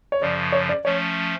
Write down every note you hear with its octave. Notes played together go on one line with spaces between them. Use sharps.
C#5
F#2 C#3 F3 D5
C#5
D5
F3 A3 C#4 C#5